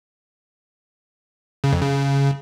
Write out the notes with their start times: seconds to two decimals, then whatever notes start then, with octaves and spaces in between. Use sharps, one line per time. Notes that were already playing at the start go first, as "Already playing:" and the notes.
1.64 C#3
1.73 F2
1.81 C#3